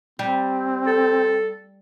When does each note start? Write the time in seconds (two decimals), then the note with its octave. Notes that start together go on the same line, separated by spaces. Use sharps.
0.19 G3 C4
0.87 A4